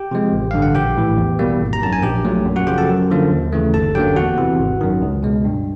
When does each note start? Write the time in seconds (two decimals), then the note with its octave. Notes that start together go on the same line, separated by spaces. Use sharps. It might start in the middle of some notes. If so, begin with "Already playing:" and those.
Already playing: G4 G5
0.11 C3 F3 G#3
0.33 A1
0.51 G2 D3 F5
0.62 F#5
0.75 A#1 G4 G5
0.97 A2 E3
1.17 E2
1.39 B2 G3 A#3
1.60 G#1
1.73 A#5
1.82 F#2 D#3 A5
1.93 G#5
2.03 A#1 G4 G5
2.24 A#2 F#3 A3
2.46 F#2
2.56 F#4 F#5
2.67 C#3 F3 G4 G5
2.78 A4 A5
2.89 F#2
3.10 D3 F3 A#3
3.31 D#2
3.52 C#3 E3 A3
3.74 G1 A4 A5
3.95 F#2 D3 F#3 A#3 G4 G5
4.16 E2 F#4 F#5
4.38 C3 E3
4.59 G#1
4.81 F#2 D#3
5.02 C#2
5.23 B2 G#3
5.45 G2